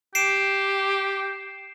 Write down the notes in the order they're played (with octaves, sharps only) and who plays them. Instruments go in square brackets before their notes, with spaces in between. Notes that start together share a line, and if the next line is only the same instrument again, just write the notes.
[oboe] G4 [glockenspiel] C7 D7 E7